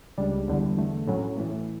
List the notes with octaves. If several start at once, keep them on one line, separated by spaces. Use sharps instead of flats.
C#2 C#3 G3 D4
E2 D3 G3
E2 D3 A3
A2 F#3 C#4
A2 E3 A3